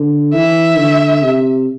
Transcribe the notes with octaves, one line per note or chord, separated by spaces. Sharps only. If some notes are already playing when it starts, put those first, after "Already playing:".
Already playing: D3
E3 E5
D3
C3